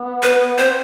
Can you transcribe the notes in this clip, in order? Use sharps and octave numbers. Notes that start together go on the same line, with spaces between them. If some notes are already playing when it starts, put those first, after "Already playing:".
Already playing: B3
B4
C4 C5